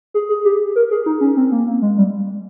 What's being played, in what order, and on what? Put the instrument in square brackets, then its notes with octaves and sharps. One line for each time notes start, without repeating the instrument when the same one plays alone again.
[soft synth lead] G#4
G#4
G4
A#4
G#4
D#4
C#4
C4
A#3
A#3
G#3
G3